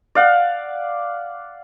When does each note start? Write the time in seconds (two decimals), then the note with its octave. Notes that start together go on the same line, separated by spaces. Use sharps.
0.15 D5 F5 F#5